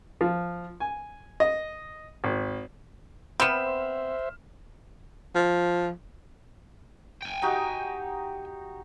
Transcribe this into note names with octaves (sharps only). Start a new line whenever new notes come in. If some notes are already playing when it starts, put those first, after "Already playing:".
F3
G#5
D#5
G#1
B3 C4 C5 E5 B5 F6 E7
F3
G5 G#5
D#4 F#4 G4